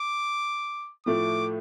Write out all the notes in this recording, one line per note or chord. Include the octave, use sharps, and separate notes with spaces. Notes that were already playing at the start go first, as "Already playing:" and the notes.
Already playing: D6
A2 F3 A3 D6